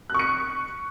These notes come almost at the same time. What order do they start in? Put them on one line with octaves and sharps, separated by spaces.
F#6 C#6 C#7